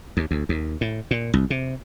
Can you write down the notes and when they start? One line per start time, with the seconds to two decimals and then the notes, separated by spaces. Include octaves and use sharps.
0.17 D#2
0.31 D2
0.49 D#2
0.81 A2
1.11 A#2
1.34 C2
1.50 C3